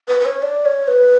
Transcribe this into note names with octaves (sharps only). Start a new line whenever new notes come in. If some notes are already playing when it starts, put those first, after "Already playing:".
B4
B4
C#5
D5
C#5
B4